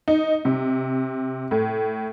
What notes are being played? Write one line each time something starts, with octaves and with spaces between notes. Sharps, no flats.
D#4
C3
A2